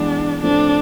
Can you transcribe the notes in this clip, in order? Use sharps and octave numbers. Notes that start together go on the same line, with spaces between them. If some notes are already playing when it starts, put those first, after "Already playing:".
Already playing: E3 G#3 B3 D4
A2 F3 A3 C4 D4 F4